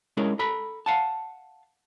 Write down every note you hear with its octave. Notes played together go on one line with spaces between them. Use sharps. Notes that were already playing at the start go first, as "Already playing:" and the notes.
G#3 C#4 E4 G#4 A#4
A4 A#5 B5
F5 F#5 A5